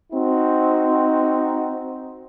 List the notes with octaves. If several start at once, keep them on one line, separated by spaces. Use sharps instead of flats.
C4 D#4 F#4